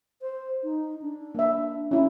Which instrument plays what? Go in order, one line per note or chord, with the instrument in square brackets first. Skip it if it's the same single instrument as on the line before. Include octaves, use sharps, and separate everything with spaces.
[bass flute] C5
D#4
D4
[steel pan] A#3 E5
C#4 E4